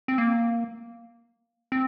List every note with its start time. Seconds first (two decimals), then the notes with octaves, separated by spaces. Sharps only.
0.08 C4
0.18 A#3
1.72 C4